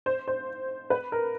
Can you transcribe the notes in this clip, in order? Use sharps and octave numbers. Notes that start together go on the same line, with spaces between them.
C5
C5
B4
A#4